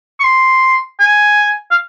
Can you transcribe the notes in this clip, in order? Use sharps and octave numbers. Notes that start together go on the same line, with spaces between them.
C#6
C6
G#5
F5